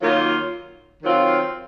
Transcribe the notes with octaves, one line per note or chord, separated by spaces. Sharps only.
D#3 F#3 A#3 F4
D#3 F#3 C4 F4